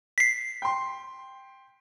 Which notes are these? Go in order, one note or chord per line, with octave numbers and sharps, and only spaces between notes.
B6 C7
G5 C6